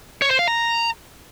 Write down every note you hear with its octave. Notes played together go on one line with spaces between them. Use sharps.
C#5
C5
F5
A#5